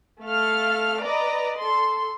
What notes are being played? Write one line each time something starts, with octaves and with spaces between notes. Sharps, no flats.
A3 A4 F5 F6
B4 D5 D#5 A#5
A4 C6